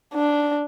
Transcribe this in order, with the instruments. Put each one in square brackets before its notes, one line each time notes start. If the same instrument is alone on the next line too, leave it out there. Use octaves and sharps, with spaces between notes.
[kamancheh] D4